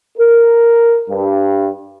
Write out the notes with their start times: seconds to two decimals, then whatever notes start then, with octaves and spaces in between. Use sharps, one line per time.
0.18 A#4
1.10 G2